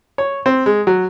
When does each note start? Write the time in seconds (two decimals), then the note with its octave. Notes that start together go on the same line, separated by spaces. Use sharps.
0.18 C#5
0.46 C4
0.66 G#3
0.87 F#3